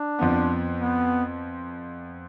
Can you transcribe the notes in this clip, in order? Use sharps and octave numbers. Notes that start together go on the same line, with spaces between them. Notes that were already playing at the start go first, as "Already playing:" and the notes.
Already playing: D4
F2 F3 B3
B3